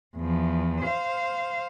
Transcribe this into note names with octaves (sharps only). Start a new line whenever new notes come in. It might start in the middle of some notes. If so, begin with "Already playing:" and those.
E2 F3
C5 F5